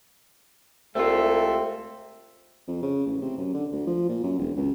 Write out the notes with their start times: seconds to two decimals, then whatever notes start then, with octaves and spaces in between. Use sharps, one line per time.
0.95 C2 G#3 A3 C4 F4 A4 E5
2.68 F2
2.82 C#3
3.06 A1
3.21 C3
3.38 F#2
3.54 D3
3.72 D2
3.87 F3
4.09 A#2
4.23 F#2
4.38 E1
4.56 C#2